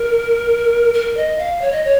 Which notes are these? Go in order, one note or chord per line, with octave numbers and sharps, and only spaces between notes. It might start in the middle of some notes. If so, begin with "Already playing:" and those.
Already playing: A#4
A#4
D#5
F5
C#5
D#5
C#5